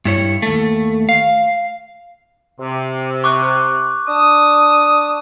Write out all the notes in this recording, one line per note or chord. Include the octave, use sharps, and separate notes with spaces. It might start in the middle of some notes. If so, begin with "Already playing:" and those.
G2 E4 C#5
D#2 A3
F5
C3
C#6 D6 F#6
D4 A5 D#6